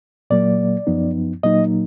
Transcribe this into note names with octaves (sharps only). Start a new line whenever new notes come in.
A#2 F#3 A#3 D5
F#2 F3 B3 D#4
A#2 F#3 A#3 D#4 D#5